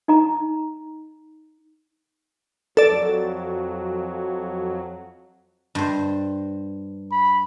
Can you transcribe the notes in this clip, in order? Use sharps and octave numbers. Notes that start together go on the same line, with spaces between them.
D#4 D#5 A#5
F2 F#3 A4 D5
G2 C5
B5